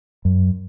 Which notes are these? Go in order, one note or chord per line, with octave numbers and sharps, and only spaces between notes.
F#2